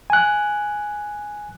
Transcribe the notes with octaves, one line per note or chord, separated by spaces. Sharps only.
G#5 F#6